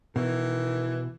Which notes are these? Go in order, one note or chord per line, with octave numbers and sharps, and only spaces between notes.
B2 D#3 E3